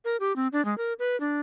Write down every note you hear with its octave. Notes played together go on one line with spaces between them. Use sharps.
A#4
G4
C4
D4
G#3
A#4
B4
D4